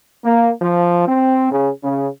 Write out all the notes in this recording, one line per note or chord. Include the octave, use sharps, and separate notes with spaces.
A#3
F3
C4
C#3
C#3